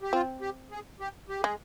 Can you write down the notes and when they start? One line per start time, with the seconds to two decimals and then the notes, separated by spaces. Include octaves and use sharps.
0.02 G4
0.13 C4 F4
0.41 G4
0.71 G#4
1.00 G4
1.29 G4
1.41 G#3 G#4